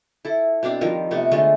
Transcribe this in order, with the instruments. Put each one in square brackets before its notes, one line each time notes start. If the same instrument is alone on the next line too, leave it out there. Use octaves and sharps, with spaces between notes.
[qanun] E4 A4
B2 C4 D4 F5
D#3 F3 G3 A#4
C3 A3 B3
D3 G#3 A3 F4